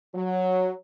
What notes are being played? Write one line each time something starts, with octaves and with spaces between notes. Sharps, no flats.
F#3